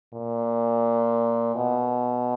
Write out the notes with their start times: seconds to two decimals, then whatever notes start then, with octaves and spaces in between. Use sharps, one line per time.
0.13 A#2
1.56 B2